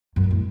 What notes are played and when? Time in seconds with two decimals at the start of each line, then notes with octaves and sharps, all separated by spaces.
0.16 F#2
0.24 G#2
0.31 A2